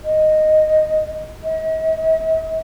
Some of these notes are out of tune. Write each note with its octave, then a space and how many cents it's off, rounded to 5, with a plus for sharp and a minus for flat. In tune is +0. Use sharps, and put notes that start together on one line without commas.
D#5 -5
D#5 +45